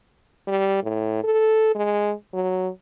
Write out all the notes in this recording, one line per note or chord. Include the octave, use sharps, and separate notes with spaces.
G3
A2
A4
G#3
F#3